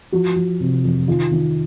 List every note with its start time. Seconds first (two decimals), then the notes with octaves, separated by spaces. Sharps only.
0.12 F3 F#4
0.36 F3
0.60 C3
0.84 F2
1.08 D#3 F4
1.31 D#3